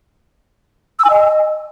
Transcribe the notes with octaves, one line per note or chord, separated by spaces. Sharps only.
E6
G#5
D#5